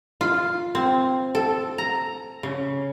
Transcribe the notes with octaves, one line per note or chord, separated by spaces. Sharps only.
F4
C4
A4
A#5
C#3